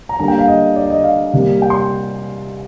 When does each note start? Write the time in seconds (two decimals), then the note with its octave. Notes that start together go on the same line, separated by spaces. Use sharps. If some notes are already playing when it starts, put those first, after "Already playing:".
0.09 A#5
0.19 D3 G3 A#3 A#5
0.28 G5
0.39 F5
0.48 D#5
0.76 D5
0.90 D#5
1.04 F5
1.33 C3 G3 A#3
1.62 G5
1.70 C6